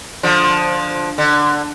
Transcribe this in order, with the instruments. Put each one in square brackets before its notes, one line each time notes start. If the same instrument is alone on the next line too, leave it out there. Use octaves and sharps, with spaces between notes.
[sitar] D3 F3
D3